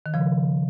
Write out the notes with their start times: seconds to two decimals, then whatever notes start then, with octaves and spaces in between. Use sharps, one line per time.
0.06 D#3
0.14 C#3 F3